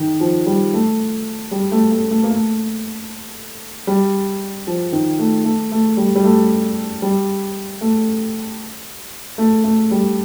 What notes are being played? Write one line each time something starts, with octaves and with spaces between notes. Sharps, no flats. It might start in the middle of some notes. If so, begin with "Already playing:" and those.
Already playing: D#3
F3
G3
A3
G3
A3
A3
A3
A#3
A3
G3
F3
D#3
A3
A3
A3
G3
G3
A3
G3
A3
A3
A3
G3